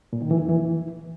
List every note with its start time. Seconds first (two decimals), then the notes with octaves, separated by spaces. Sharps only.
0.13 A#2
0.22 D#3
0.31 E3
0.40 F2
0.49 E3